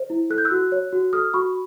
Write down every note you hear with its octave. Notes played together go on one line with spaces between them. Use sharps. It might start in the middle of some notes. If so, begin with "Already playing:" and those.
Already playing: C5
E4
A4 F#6
G6
E6 F#6
F#4
C#5
F#4
A4 D#6 F6
F#4 B5 C#6